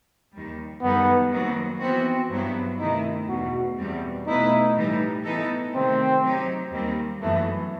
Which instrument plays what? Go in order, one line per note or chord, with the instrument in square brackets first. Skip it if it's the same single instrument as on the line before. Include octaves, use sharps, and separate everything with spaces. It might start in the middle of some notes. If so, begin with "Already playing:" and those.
[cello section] D#2 D#3 G3
[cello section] F#2 D#3 G3 D#4 A4 [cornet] B3
[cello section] D#2 D#3 F#3 C4 F#4
[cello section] E3 B3 F#4 [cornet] C4
[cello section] G2 F#3 B3 E4
[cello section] C3 D#3 A3 E4 [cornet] D#4
[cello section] E2 B2 A3 [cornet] F#4
[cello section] E2 B2 G3 C4
[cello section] B2 A3 E4 B4 [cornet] D#4
[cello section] A2 E3 G3 D#4
E3 B3 D#4 A4
[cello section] C3 D#3 A3 [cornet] C4
[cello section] F#3 C4 D#4 G4
D#2 D#3 G3 C4
[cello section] F#2 E3 B3 [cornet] A3